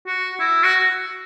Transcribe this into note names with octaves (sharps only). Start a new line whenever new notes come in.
F#4
E4
F#4